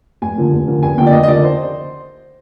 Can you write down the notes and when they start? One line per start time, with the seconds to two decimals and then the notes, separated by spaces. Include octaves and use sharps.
0.22 F1 G#5
0.37 D#2 D3 F3 A#3
0.52 F1
0.67 D#2 D3 F3 A#3
0.83 F1 G#5
0.97 D#2 D3 F3 A#3 G5
1.06 D5
1.13 F1 D#5
1.23 D#5
1.28 D#2 D3 F3 A#3 D5
1.44 C5